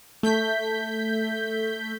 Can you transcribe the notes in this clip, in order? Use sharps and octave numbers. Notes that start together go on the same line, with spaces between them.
A3 G6 B6